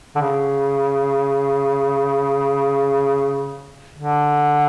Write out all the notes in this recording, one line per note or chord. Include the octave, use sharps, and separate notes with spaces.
D3
C#3
D3